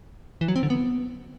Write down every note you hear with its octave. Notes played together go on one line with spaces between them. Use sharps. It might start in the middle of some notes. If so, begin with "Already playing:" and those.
E3
F#3
C4
D3
B3